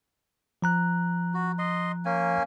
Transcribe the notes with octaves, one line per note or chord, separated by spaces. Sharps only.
F3 A#5 F#6
F#4
D#5 C6
A#3 C#4 G#5